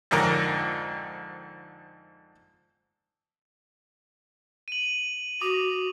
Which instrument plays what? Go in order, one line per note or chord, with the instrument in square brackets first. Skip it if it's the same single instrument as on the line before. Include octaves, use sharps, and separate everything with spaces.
[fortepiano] F2 G#2 D3 A#4
[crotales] D#7 F#7
[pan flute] F#4 [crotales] D6 D#6